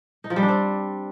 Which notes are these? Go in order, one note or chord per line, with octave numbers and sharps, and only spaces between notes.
D#4
F3
G3
D4
C4